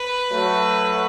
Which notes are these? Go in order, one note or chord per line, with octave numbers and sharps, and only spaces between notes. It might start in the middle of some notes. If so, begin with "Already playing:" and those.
Already playing: B4
F#3 A3